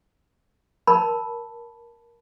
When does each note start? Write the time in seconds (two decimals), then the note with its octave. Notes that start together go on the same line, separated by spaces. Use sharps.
0.87 A#4 A5 B5